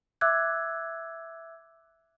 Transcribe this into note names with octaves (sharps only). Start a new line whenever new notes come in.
E5 D6 E6 F#6 G#6